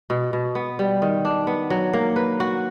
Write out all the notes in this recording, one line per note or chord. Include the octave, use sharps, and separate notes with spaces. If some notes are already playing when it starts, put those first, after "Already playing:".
B2
B2
B3
G3
D#3
D4
B3
F#3
A#3
B4
F#4